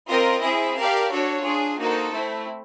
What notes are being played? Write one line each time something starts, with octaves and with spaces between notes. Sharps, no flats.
C4 F4 A#4 D#5
C4 E4 G#4
G4 A#4 D5 F5 A5
D4 F#4 A4 C#5
D4 F4 G#4
A#3 D#4 F#4 A4 C5
A3 C4 E4